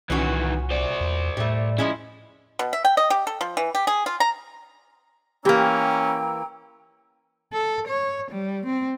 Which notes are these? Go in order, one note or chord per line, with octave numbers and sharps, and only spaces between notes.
C2 A#2 D#3 E3 C#4 F#4
C5 D5
E2
A2 G3 A3
F3 G#3 C#4 E4
B2
E5
G5
D#5
G4
A4
F3
E3
G4
G#4
F4
A#5
E3 A#3 C#4 G4 G5 A#5 E6
A4
C#5
G3
C4